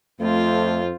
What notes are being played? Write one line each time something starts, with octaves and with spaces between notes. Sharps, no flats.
F2 A3 C4 F4